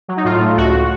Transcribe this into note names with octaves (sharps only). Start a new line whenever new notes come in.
F#3
D#4
A2 F4
A3
C#2 F#4